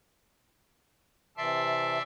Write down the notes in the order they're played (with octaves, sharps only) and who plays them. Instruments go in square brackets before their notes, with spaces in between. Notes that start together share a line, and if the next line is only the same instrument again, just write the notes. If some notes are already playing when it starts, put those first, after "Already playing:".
[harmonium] C3 E3 A5 [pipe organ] D5 E5 C6